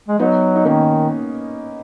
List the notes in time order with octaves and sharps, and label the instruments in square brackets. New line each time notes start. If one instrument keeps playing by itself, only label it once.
[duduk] G#3
[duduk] F#3 [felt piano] B3 D#4
[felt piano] D#4
[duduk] D#3 [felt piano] A#3 C#4